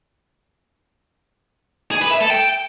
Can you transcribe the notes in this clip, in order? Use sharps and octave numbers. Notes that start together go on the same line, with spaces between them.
G#4
B4
E5
A4
G5